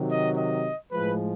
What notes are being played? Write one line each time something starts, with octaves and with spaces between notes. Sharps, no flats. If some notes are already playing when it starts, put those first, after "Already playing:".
Already playing: C3 D#3 F#3
D#5
D#5
A2 F3 G#3 B4